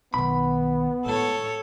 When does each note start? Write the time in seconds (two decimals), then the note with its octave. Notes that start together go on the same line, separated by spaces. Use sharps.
0.14 B1 D#3 B3 B5
1.05 A2 G#3 A4 C#5